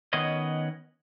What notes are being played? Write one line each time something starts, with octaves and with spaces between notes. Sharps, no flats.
D#3 B3 C#4 B4 C#5 D#5